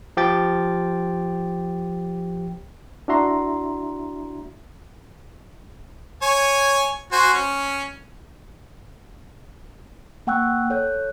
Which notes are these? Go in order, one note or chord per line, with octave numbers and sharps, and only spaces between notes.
F3 G4 G5 A6
D4 E4 F#4 E5 A#5 C6
C#5 G#5
F#4 C5 G#5
C#4
A#3 F#5 G5 C#6 E6 F#6
A4 C#5 F#6 G6